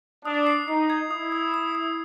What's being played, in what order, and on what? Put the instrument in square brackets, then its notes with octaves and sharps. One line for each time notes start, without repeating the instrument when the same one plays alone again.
[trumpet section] D4 [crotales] D#6
[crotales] C7
[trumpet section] D#4 [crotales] C7
[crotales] G#6
[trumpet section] E4 [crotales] D#6
[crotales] D#6
D#6
D#6